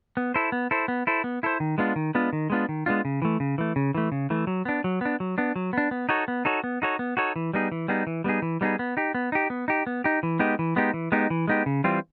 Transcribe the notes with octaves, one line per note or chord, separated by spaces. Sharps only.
B3
E4 A4 C5
B3
E4 A4 C5
B3
E4 A4 C5
B3
E4 A4 C5
D#3
G#3 B3 D4 F4
D#3
G#3 B3 D4 F4
D#3
G#3 B3 D4 F4
D#3
G#3 B3 D4 F4
C#3
E3 A3
C#3
E3 A3
C#3
E3 A3
C#3
E3 A3
F#3
B3 D4
F#3
B3 D4
F#3
B3 D4
F#3
B3 D4
B3
D#4 F#4 A4 C#5
B3
D#4 F#4 A4 C#5
B3
D#4 F#4 A4 C#5
B3
D#4 F#4 A4 C#5
E3
G3 B3 D#4 G#4
E3
G3 B3 D#4 G#4
E3
G3 B3 D#4 G#4
E3
G3 B3 D#4 G#4
B3
D#4 G4
B3
D#4 G4
B3
D#4 G4
B3
D#4 G4
E3
G#3 B3 D#4 G4
E3
G#3 B3 D#4 G4
E3
G#3 B3 D#4 G4
E3
G#3 B3 D#4 G4
C#3
E3 G3 C4 F4